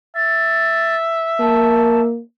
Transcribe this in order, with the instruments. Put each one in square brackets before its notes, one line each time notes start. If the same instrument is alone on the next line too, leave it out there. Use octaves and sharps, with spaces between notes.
[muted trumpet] E5 [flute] A6
[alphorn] A#3 [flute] A5